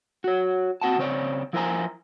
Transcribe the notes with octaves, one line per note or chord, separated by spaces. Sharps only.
F#4 C#5
C4 F#4 F#5 A5
C#3 C4 C#5 D5
F3 E4 A#4 C5 G#5 A#5